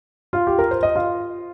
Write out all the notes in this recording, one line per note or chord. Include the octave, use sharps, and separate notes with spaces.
F4 F5
G4
A#4
C5
D#5
F4 F5